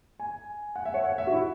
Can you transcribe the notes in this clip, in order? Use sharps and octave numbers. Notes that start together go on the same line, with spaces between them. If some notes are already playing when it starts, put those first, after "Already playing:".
G#5
F#5
E5
C#5
F#5
E5
F#4
E4